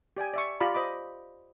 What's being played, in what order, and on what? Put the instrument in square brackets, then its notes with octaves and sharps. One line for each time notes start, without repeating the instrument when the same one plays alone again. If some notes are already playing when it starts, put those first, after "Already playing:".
[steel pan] G4 D5 G5 G#5
D5 E5 C#6
F4 G4 D5 A#5 B5
C5 D#5 B5 D6